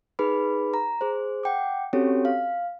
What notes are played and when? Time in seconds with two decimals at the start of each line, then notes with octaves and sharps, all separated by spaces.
0.19 D#4 G#4 B4 B5
0.74 A#5
1.01 G#4 C5
1.43 F#5 G5 D6
1.93 C4 C#4 F#4 G4 A4 C#5
2.25 F5